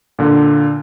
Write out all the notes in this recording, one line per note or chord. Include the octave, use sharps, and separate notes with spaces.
A#2 D3